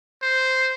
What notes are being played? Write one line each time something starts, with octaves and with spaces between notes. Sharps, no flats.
C5